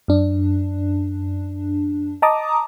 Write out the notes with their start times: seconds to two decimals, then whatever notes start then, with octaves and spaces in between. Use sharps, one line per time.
0.08 F#2 D4
2.22 D#5 A5 A#5 D6 D#6